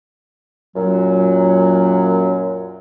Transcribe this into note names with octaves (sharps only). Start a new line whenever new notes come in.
F#2 A#2 F#3